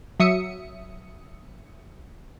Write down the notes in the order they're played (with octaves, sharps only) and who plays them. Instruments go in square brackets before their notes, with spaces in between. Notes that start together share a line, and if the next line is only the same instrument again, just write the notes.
[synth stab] F#3 E5 D#6 C#7